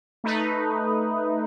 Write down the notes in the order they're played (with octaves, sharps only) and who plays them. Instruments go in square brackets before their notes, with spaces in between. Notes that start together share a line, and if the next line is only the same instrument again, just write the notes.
[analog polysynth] A3 D#4 B4